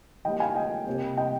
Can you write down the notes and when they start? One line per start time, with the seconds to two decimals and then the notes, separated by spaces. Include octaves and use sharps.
0.25 D#3 G3 A#3 D#5 G5
0.40 F5 G#5
0.56 D#5 G5
0.87 C3 G3 A#3
1.17 D#5 G5